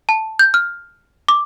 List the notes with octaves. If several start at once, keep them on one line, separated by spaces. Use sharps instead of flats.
A5
G6
F6
D6